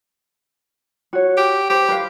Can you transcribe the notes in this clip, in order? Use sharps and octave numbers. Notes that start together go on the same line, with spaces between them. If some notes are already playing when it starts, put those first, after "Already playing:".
F#4 C#5
G4
G4 C5
B4 F5